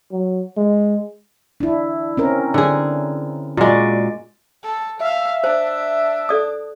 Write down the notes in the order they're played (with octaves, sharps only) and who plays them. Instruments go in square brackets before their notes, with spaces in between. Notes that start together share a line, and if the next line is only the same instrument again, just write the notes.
[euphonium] F#3
G#3
[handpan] D4 E4
C4 C#4 A#4
[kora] D3 G#4
[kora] A#2 G#3 [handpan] F#4 D5
[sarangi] A4
[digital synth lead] E5 [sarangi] F5
[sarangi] D4 [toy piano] C5
[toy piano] A4 D5 D#6